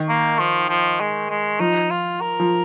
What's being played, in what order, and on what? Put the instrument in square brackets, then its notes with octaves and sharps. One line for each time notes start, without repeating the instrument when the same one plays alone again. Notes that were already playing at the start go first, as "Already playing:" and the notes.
Already playing: [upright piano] D#3
[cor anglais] A#3
F3
F3
G#3
G#3
[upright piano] F3 [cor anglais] D#4
[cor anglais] F4
A#4
[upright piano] F3